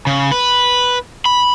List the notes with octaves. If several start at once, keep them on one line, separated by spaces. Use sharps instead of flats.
C#3
B4
B5